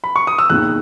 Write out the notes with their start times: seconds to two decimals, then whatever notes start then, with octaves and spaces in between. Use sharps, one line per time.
0.04 B5
0.16 C#6
0.27 D#6
0.39 E6
0.50 E1 D#2 D#3 F#6